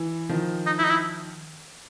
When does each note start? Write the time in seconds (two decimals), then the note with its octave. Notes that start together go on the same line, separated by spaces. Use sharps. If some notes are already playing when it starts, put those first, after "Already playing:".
Already playing: E3
0.29 D#3 F3
0.66 D#4
0.79 E4
0.84 D#4
0.90 E4